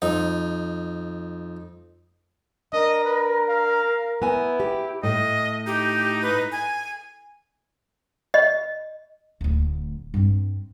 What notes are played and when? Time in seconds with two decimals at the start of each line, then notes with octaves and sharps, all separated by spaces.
0.02 F2 D#4
2.73 D4 A#4 D#5
3.05 B4
3.48 F5
4.22 B3 E4 G#5
4.60 G4 G5
5.03 A2 D#5
5.66 D#4 G4
6.22 B4
6.52 G#5
8.34 D#5
9.41 D1 D2
10.14 G2 C4